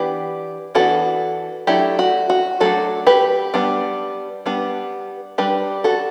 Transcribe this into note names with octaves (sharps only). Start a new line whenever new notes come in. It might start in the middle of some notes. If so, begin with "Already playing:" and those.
Already playing: E3 B3 D4 G4 B4
E3 B3 D4 F#4 A4
F#3 A3 D4 E4 G4
F#4
F#4
F#3 A3 D4 F#4 A4
G4 B4
G3 B3 D4
G3 B3 D4
G3 D4 G4 B4
F#4 A4